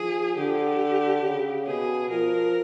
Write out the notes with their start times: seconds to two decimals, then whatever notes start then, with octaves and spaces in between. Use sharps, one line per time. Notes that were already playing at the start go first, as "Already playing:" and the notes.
Already playing: F3 G#4
0.36 D3 G4
1.23 C#3
1.67 B2 G#4
2.10 F3 A#4